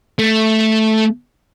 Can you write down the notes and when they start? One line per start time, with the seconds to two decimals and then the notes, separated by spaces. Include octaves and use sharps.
0.19 A3